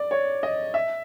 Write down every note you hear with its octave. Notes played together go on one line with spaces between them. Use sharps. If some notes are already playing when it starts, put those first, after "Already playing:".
Already playing: D5
C#5
D#5
E5